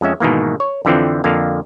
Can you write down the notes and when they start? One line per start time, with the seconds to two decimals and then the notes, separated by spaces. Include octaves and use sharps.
0.01 F2 G#3 C#4 E5
0.20 G#2 B2 D#3 E3 A#3
0.60 C#5
0.85 F2 D3 E3 F3 C4
1.24 F2 D3 A#3 F5